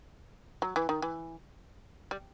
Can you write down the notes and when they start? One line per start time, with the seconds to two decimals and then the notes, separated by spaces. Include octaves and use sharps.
0.62 F#3
0.76 E3
0.89 D#3
1.02 E3
2.11 G3